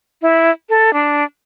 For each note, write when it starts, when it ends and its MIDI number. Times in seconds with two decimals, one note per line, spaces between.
0.22 0.51 64
0.69 0.93 69
0.93 1.24 62